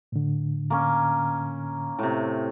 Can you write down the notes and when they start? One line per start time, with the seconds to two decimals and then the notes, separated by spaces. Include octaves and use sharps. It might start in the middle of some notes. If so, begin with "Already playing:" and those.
0.12 A2 D3
0.70 A#3 C#4
1.99 A2 C3